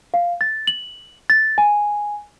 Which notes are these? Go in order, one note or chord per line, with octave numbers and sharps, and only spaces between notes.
F5
A6
F#7
A6
G#5